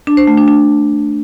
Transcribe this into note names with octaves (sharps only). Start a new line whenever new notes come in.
D4
C5
A3
D4
D4